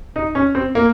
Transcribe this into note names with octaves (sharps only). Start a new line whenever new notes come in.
D#4
C#4
C4
A#3